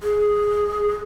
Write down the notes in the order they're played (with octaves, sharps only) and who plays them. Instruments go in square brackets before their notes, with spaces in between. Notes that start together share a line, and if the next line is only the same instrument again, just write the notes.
[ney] G#4